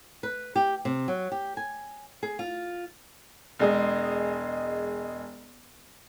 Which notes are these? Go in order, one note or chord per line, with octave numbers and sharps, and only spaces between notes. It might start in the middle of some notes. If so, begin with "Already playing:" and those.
B4
G4
C3
F#3
G4
G#5
G#4
F4
E1 G#3 D#5